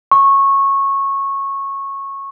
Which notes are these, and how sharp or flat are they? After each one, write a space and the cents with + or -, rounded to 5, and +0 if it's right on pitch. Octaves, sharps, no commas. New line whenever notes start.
C#6 -15